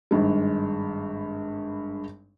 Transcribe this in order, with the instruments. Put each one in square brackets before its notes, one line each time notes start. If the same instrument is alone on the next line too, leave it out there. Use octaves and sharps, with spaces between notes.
[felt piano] G#1 G2 G#3